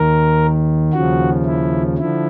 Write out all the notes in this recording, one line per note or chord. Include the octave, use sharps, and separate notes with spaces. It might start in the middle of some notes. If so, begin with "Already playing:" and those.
Already playing: D#2 D#3 A#4
D#2 C#3 F3 F#4
E4
D3 F3 E4